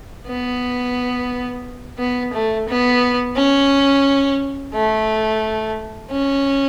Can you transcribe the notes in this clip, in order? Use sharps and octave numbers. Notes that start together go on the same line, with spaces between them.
B3
B3
A3
B3
C#4
A3
C#4